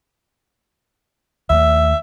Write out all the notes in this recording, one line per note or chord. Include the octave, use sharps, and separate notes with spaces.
D#2 G3 A3 E5